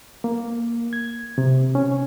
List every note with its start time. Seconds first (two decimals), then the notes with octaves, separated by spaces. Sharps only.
0.24 A#3
0.93 G#6
1.38 C3
1.75 C#4